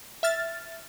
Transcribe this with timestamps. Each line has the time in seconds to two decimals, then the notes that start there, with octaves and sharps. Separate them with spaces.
0.23 E5 F6 A6